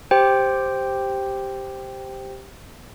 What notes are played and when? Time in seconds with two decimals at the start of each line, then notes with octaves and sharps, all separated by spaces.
0.11 G4 C5 G5